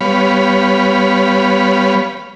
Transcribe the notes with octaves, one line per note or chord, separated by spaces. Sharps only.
G3 B3 C#5 F5 B5